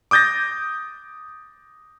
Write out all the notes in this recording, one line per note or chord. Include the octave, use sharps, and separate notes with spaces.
D6 D#6 G6 A6 A#6